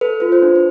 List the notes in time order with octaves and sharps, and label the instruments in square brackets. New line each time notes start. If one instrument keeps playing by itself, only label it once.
[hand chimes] A4 B4
F4 B4
C5
D4
B4